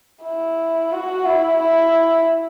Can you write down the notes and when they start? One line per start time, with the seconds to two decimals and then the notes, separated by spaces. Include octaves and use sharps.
0.23 E4
0.92 F#4
1.25 E4
1.61 E4